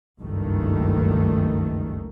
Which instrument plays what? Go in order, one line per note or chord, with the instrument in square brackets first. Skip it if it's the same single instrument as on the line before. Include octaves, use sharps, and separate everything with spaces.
[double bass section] F#1 C#2 G2 D#3 A3